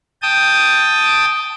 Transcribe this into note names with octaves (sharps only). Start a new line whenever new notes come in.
G5 A5 D#6